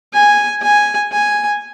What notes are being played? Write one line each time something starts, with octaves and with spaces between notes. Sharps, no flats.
G#5
G#5
G#5